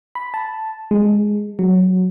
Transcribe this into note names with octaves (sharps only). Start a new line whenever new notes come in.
B5
A5
G#3
F#3